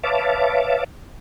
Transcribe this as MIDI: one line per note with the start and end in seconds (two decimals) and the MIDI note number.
0.04 0.84 71
0.04 0.84 73
0.04 0.84 76
0.04 0.84 77
0.04 0.84 81
0.04 0.84 86